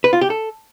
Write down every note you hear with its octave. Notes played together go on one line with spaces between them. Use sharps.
B4
F4
G4
A4